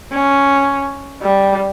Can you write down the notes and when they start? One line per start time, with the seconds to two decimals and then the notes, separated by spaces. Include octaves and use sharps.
0.12 C#4
1.22 G3